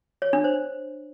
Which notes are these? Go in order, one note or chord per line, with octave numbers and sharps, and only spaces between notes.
C#5
D4
C5